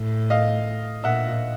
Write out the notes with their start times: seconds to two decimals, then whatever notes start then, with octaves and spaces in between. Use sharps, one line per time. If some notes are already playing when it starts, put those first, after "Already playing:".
Already playing: A2
0.30 D#5 F5
1.04 A#2 E5 F#5